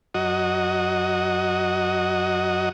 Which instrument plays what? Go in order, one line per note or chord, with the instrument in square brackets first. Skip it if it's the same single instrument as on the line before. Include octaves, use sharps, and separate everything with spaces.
[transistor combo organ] F#2 F#4 D#5